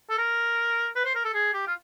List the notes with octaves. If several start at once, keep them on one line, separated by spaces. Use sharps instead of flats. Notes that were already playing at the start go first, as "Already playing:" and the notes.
A4
A#4
B4
C5
A#4
A4
G#4
G4
F4